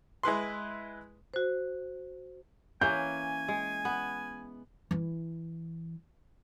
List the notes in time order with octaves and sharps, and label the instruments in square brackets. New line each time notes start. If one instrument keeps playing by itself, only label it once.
[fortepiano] G#3 E4 B4 C6
[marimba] F#4 C5
[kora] E3 A#3 C#4 [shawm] G#5 [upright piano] G6
[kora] G#3
B3
[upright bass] E3 E4